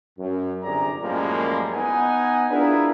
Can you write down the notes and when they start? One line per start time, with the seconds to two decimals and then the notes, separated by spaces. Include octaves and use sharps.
0.18 F#2
0.63 G1 C3 G#4 D5 A#5
1.01 F#2 A2 F3 G3 G#3 A#3
1.73 B3 D#4 B4 F#5 G#5
2.51 D4 E4 F4 G#4 A#4 B4